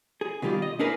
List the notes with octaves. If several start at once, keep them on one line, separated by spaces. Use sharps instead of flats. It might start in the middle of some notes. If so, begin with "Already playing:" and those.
G#4
B2 D#3 G3 F4 G4
D#5
C#4 D4 E4 G#4 A#4 B4